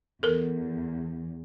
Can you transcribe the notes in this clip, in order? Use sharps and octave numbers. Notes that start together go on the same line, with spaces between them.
E2 A4 A#4